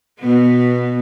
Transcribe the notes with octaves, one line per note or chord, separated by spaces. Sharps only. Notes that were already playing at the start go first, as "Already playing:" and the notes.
B2 B3